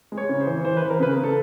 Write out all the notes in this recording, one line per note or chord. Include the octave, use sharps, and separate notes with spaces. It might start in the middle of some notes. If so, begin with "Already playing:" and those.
G#3
C#5
C#3
C5
E3
E3 C5
E3 B4
A#4
C#3 B4
C#3
A4